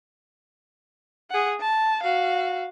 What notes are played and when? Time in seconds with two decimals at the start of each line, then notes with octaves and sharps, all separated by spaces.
1.30 G#4 F#5
1.60 A5
2.03 F#4 F5